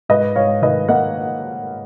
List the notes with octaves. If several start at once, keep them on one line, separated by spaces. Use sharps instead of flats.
G#2 B4 D#5
G#2 C#5 F5
D#3 B4 D#5
A#3 D#5 F#5